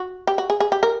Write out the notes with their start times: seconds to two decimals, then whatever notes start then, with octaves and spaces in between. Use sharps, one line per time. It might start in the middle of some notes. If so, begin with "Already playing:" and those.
Already playing: F#4
0.27 G4
0.38 F#4
0.50 G#4
0.60 G#4
0.72 G4
0.83 A#4